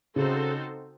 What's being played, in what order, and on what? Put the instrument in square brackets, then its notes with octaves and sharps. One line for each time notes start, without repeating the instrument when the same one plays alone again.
[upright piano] C#3 [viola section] C4 D#4 F#4 A4 C5